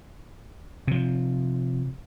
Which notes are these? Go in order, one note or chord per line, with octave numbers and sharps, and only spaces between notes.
C3 F3